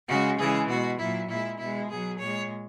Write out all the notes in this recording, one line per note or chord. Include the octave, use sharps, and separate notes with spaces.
C#3 G#3 F#4
C#3 E3 G#3 G#4
B2 G#3 F#4
A#2 F#3 E4
A#2 G#3 E4
B2 G#3 E4
B2 F#3 G#4
A#2 G#3 C#5